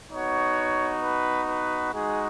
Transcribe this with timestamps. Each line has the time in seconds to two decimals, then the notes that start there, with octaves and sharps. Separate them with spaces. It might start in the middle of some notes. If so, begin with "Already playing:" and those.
0.11 B3 D#4 F#4 C#5
1.02 B4
1.48 B4
1.92 G#3 D#4 F#4 G#4